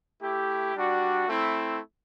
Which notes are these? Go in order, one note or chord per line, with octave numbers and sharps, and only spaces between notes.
A3 E4 G4
G3 D4 F#4
A3 C4 E4